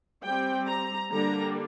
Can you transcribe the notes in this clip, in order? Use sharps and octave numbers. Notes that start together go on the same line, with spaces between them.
G3 C4 G5
A#5
D3 G3 A#3 D4 A#5